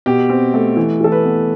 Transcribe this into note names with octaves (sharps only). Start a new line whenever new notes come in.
B2 G4
C4
A3
E3
E3 A4
B4
B3